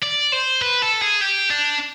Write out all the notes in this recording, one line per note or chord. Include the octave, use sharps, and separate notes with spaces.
D5
C5
B4
A4
G#4
G4
D4